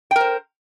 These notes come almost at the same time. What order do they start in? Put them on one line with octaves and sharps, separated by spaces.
G5 A#4 C5